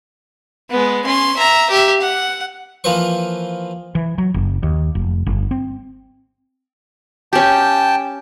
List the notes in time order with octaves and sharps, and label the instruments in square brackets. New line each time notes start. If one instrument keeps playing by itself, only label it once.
[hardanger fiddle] G#3 B3
C#4 C6
E5 A#5
G4 E5
F#5
[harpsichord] E3 F3 A#3 B4 C5 C#6
[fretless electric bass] E3
F#3
F#1
D#2
F1
G1
C4
[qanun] C#4 G4 [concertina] G5 A5